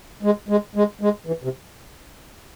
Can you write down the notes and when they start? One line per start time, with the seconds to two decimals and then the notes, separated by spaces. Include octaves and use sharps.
0.23 G#3
0.49 G#3
0.76 G#3
1.01 G#3
1.27 E3
1.44 C3